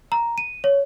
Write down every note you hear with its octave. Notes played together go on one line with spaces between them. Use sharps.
A#5
D#7
C#5